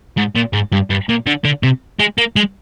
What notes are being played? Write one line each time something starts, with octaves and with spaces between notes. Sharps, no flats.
G#2
A#2
G#2
G2
G2
A#2
D3
D3
C3
G#3
A#3
G#3